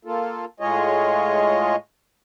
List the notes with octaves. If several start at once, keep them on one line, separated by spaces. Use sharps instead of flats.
A#3 F4 A4
A2 G#3 F4 G#4 C#5 D#5